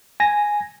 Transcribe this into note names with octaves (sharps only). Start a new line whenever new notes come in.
G#5 A#6